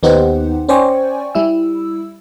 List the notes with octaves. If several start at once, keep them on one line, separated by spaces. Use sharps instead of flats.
D#2 B3 D#4 G4 C5 F#5
C#4 C5 D5 G5 G#5 C#6
G3 E4 E6